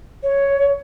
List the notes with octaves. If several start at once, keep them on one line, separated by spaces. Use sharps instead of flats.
C#5